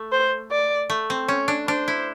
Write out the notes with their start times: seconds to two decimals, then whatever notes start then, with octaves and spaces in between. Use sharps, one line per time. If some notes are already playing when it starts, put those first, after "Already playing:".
Already playing: A3
0.12 C5
0.51 D5
0.90 A3
1.10 C4
1.28 C#4 C#5
1.48 D4
1.67 D4 C5
1.88 E4